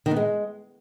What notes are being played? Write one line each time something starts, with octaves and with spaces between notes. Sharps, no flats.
D#3
B3
G#3